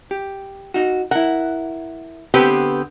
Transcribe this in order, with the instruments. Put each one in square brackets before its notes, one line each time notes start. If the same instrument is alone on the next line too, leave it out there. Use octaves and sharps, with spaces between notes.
[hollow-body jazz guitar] G4
D#4 F#4
[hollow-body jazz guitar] E4 A#4 [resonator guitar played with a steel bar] F#5
[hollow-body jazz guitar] D3 B4 B5 [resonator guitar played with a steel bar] B3 C4 G4